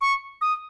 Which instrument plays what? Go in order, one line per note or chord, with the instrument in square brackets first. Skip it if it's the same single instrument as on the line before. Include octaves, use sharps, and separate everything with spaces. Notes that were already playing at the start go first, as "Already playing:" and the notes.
[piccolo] C#6
D#6